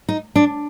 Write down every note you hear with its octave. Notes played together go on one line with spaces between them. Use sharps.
D#4
D4